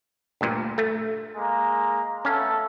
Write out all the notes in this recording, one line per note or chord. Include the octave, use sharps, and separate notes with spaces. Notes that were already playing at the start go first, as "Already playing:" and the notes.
D2 G2 A#2
A3
G#3 A#3 A#5
A3 B3 C#4 A4 F5